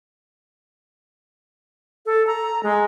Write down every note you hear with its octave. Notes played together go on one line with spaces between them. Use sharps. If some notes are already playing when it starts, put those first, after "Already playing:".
A4
A#5
G#3